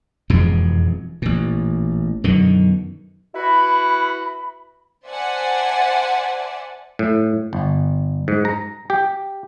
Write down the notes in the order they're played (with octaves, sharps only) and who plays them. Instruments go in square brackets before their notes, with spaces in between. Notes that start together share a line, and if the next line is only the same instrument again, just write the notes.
[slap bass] E1 F2 G#2 B2
A1 A#2
F#2 B2 D3 D#3
[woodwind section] E4 F#4 B4 B5
[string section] C5 D5 E5 F#5 G#5 A5
[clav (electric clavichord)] A2
G1
G#2
A#5
G4